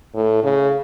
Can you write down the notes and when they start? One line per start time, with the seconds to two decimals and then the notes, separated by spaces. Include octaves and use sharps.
0.15 A2
0.43 C#3